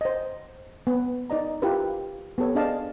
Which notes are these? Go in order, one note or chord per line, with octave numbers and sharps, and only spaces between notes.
C5 D#5
B3
D#4 D5 D#5 A#5
E4 F4 G4 A#4 B4
B3 G4 A4 C#5
D4 G#4 D5 D#5 F5 A5